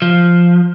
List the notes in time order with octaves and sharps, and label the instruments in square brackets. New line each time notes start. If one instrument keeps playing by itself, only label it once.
[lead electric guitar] F3